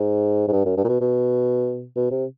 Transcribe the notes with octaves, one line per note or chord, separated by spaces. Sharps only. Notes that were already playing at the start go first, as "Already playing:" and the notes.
Already playing: G#2
G#2
G2
F#2
G2
A#2
B2
B2
B2
C3